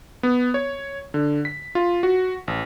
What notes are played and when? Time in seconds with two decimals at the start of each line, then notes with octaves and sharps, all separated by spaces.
0.23 B3
0.54 C#5
1.14 D3
1.45 B6
1.75 F4
2.03 F#4
2.48 A1